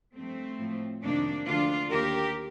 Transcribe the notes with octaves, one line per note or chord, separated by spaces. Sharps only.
G2 F3 A3 C4
A2 F3
F2 C3 D#3 A#3 D4
D2 D3 F3 D4 F4
D#2 D#3 G4 A#4